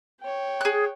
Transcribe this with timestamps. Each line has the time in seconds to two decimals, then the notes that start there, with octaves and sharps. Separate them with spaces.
0.21 C#5 G5
0.61 G#4 F#6